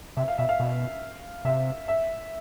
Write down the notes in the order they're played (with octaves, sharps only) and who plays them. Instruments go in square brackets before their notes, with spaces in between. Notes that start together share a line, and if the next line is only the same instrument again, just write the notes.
[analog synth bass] C3 [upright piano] E5
[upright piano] F5
[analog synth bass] B2 [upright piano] E5
[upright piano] F5
[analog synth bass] B2
[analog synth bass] C3 [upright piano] E5
[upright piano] E5